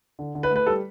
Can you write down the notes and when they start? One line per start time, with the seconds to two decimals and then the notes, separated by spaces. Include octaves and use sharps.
0.19 D3
0.35 D3
0.43 B4
0.50 A3
0.56 B4
0.66 G3 A4